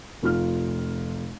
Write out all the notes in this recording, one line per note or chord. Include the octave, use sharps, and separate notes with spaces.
F1 F4 F6